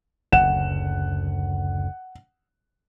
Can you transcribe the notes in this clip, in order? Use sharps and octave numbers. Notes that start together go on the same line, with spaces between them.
F#1 D2 F#5 E7